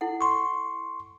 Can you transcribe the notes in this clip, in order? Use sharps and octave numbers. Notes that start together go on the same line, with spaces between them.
E4 A4 F#5
C6 C#6